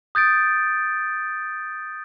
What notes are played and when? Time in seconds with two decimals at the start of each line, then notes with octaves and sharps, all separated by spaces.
0.15 D#6 G6 A6 D7